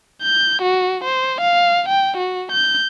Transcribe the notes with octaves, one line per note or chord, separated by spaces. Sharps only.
G6
F#4
C5
F5
G5
F#4
G6